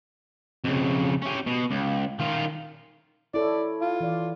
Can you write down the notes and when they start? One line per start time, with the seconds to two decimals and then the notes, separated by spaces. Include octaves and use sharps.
0.65 F2 C#3
1.22 C#4 G4
1.47 B2
1.71 C#2
2.20 D#3 F4
3.34 E4 A4 C#5 D5
3.81 F4
4.00 E3 D5